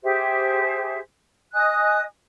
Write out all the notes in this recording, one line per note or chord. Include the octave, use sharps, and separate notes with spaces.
G4 G#4 C5 E5
D#5 G#5 D#6 F#6